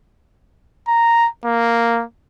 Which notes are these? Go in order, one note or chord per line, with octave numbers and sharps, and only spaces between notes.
A#5
A#3